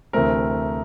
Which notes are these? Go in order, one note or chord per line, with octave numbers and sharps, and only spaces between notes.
D2 C3 E3 A3 C4 A#4